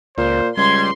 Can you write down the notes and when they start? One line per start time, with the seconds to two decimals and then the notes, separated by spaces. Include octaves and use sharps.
0.18 C#2 A#2 C5
0.57 C#2 G3 C6 G#6